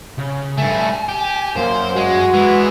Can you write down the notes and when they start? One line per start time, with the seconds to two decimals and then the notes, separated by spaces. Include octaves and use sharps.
0.18 C#3
0.58 G2 A3 G#5
1.09 G4
1.56 F#2 A#3 C5
1.96 G#3 F#4
2.34 E3 G#3 B3